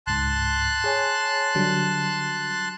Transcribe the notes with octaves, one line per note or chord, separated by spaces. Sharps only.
C#2 G#2 A5 C6 F#6
G#4 C#5 G#5
D3 F#3 G3